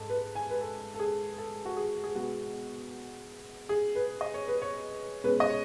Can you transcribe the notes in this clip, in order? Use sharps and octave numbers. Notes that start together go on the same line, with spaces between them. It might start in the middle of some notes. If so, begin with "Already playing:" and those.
Already playing: G#2 A4
B4
G#5
B4
A4
A4
G#4
A4
F#4
G#4
G#4
B2 G#3 B3 F#4
G#4
B4
D#5
C#5
B4
C#5
B2 G#3 C#4 B4
D#5
C#5